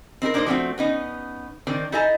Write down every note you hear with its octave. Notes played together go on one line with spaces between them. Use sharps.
C4 D#4 G#4 A#4
A#3 D4 D#4 A#4 C5 D#5
F3 G3 A3 A#3 C4 F#4
B3 C#4 D#4
D#3 C4 D4
D#4 E4 A4 D#5 G#5 A#5